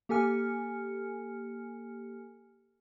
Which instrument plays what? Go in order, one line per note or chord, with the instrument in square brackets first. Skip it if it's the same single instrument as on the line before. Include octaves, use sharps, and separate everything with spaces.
[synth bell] A#3 G4 A4 G#5 F6 C#7